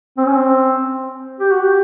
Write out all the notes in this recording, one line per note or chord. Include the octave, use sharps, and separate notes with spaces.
C4
C#4
C4
G4
F#4
G4